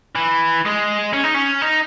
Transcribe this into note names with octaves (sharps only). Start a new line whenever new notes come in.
E3
G#3
C#4
D#4
C#4
D#4